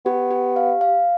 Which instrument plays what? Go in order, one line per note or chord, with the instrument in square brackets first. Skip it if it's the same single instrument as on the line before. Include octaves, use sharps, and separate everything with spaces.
[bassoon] B3 [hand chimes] G4
[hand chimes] G4
F5
F5